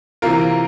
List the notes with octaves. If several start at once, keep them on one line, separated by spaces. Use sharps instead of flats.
C3 E3 A#3 F4 A#4